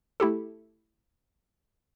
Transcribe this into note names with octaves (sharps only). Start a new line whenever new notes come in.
A3 E4 G4 A4